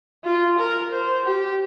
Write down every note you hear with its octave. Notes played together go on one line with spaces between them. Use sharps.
F4
A#4
C5
G4